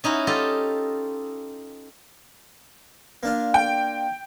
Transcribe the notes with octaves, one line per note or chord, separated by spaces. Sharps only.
C#4 D#4 E4 F#4
F4 G4 A4 D#5
A#3 D4 F4
G5